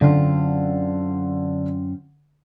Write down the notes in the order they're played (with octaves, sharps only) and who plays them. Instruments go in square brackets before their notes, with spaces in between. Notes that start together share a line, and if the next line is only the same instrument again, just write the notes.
[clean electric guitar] F#2 C4 F4 [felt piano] D3